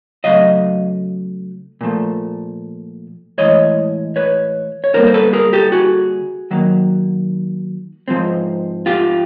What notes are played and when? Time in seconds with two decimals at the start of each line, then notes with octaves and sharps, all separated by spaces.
0.24 C#3 F#3 A3 D#5 F5
1.81 A#2 F3 A3
3.38 A2 E3 G#3 C#5 D#5
4.16 B4 C#5
4.84 C#5
4.94 D3 G3 A#3 A#4 C5
5.07 C5
5.14 A4 B4
5.33 G#4 A#4
5.53 G4 A4
5.72 F#4 G#4
6.51 D#3 F#3 A#3
8.08 G#2 F3 G#3 C4
8.86 F4 G4